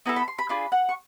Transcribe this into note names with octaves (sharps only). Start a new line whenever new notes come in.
B3 E4 A4 A#5
B5
C6
B5
D4 F4 G#4 B5
F#5
C#6